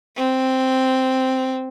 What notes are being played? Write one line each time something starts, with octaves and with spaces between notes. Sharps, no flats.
C4